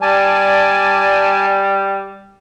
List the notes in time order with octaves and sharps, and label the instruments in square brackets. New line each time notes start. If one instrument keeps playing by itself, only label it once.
[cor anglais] G3 [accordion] D5 G#5 A5